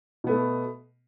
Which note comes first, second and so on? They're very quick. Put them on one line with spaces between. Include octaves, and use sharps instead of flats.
B2 B3 A3